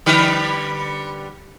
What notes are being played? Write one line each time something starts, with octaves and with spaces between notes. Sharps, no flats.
D3 G3 B4